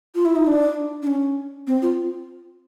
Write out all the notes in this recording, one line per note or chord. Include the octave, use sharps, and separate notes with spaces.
F4
E4
D#4
D4
D4
C#4
C4
F4